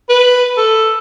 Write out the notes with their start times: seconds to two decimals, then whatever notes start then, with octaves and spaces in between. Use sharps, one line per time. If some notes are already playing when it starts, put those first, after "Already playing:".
0.09 B4
0.57 A4